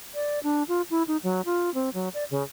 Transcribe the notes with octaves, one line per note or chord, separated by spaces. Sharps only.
D5
D4
F4
E4
D#4
F#3
F4
C4
F#3
D5
C#3